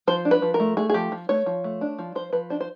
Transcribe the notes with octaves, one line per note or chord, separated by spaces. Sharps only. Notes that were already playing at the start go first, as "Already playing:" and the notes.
F3 C5
D4
B4
F3
A#4
A3
A3 G#4
G#4
F3 G4
F3
A3 C#5
F3
A3
D4
F3
F3 C5
F3 B4
D4 C5
C5